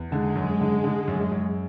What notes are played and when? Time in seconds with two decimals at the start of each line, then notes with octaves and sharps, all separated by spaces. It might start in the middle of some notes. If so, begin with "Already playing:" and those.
Already playing: E2
0.12 D3 G#3
0.36 F#2
0.60 D3
0.84 D3
1.08 F#2
1.32 F#2